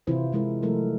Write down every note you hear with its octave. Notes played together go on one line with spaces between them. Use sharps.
C3 E3 E4 F4 C5
E3 G#3 E4 A#4
F3 F#3 A3 A4 A#4